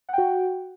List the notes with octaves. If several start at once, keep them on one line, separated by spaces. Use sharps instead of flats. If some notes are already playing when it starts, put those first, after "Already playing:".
F#4 F#5 G5